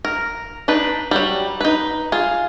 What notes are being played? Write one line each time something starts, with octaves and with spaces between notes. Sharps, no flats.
A#4
D4 D#4 B4
F#3 G3
D#4 B4
F4 G#4